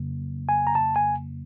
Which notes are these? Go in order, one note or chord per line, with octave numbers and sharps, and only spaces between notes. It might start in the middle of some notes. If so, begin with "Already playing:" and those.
Already playing: F2 C#3 F#3 A#3
G#5
A#5
A5
G#5